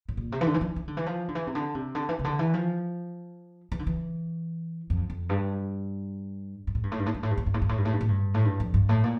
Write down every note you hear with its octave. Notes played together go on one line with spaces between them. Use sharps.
A2
A#2
C3
E3
D3
E3
F3
E3
D3
E3
F3
D3
E3
C3
D3
C3
D3
E3
C3
D3
E3
F3
E3
D3
E3
F2
F2
G2
G2
A2
G2
A2
G2
A2
G2
A2
G2
A2
G2
A2
G2
A2
G2
A2
G2
A2
G2
A2
G2
F2
G2
A2
A#2